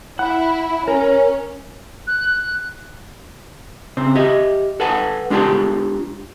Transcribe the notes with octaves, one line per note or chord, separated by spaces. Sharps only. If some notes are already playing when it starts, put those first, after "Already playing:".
E4 F#5
C#4 A#4
F#6
C#3 C4 C5
G4 D#5 E5
A4 B4 F#5 G#5 A5
G#3 D4 F4 G4 G5 A5